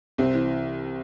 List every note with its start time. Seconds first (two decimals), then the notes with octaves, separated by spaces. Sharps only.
0.18 C2 C4
0.34 E3